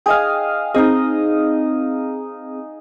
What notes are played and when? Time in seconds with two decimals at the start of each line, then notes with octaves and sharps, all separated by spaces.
0.06 G#4 D#5 F5 G5 G#5
0.75 C4 D#4 G#4 D#5